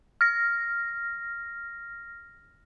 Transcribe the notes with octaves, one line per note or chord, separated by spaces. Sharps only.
F6 A#6